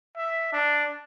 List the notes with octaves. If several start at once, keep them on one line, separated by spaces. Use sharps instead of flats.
E5
D4